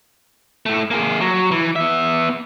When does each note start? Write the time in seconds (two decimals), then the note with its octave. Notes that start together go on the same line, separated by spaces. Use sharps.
0.66 A2 A3
0.91 A#3 G#4
1.21 F#3
1.51 E3
1.76 B3 E5